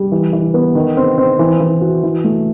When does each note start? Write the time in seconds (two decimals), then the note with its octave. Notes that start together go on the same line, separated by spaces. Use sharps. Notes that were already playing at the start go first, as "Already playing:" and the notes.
Already playing: G3
0.12 E3
0.33 E3
0.54 B3
0.75 D#3
0.97 C4
1.18 C4
1.39 E3
1.61 E3
1.81 F#4
2.03 E3
2.24 A3